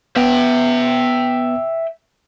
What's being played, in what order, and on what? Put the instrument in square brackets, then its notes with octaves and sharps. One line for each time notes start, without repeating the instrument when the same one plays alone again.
[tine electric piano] B3 [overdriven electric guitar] E5 G5